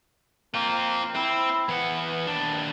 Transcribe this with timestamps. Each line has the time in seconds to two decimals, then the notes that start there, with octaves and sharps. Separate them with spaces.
0.54 A#3 C4 F4
1.15 C4 E4
1.69 E3 B3 F#5
2.27 D#2 D4